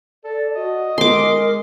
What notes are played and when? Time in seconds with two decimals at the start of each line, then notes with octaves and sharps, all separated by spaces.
0.24 A4 D5
0.55 F#4 D#5
0.98 G#3 A#4 C6 D6